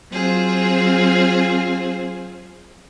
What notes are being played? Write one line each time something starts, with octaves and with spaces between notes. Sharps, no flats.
F#3 C4 F4 G#4 C5